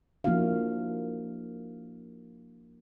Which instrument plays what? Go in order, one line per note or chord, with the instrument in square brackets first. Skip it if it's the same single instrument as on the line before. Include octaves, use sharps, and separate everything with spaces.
[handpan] F3 A#3 D4 E4 F#4 F5